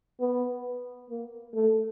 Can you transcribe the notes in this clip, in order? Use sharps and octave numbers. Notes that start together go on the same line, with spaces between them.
B3
A#3
A3